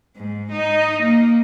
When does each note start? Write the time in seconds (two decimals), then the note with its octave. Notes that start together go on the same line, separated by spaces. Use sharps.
0.17 G#2
0.51 D#4
1.02 A#3